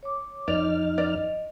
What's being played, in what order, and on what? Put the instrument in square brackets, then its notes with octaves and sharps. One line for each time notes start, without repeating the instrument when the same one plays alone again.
[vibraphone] C#5 D6
[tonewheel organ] F2 D#4 F6 [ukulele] D5
[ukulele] D5 [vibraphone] D#5